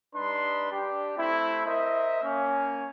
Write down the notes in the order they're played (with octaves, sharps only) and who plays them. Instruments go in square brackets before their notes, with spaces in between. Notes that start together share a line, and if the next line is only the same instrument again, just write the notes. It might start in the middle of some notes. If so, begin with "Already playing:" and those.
[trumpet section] G3 D4 D#4 B4 C6
D4 G4
A3 C4 E4
A#4 C5 D#5 E5
A#3 C#4